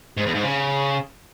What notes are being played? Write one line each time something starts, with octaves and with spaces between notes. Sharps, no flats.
G#2
E2
G#2
C#3